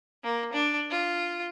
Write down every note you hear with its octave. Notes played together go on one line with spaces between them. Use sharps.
A#3
D4
F4